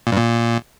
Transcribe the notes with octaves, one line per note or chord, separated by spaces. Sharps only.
A#2
G2
A#2